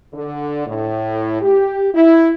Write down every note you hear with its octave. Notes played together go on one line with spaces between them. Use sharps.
D3
A2
G4
E4